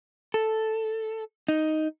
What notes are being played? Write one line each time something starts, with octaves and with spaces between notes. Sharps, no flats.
A4
D#4